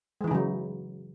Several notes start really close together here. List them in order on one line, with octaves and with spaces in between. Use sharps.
G#3 E3 D#4 C#3 F#3